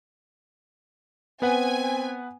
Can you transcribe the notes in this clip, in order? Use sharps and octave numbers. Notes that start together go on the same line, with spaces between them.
B3 C4 B4 F#5 G#5